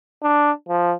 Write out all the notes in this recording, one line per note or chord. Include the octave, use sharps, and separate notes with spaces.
D4
F3